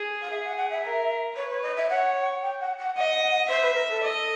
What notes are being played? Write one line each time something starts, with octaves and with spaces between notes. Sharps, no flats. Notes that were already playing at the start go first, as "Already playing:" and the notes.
Already playing: G#4
F5
G#4 E5
F#5
F#5
E5
A#4
B4 C#5
C#5
D#5
E5
C#5 F#5
G5
F#5
F#5
D#5 F#5
C5 E5
B4
A#4
A4
D#5